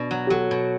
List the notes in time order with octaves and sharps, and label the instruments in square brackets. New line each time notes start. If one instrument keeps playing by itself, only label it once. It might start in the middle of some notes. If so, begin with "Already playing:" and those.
Already playing: [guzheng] B2 [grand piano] D4
[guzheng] F#3
[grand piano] G4
[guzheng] F#3 [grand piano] F#4 A4
[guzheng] B2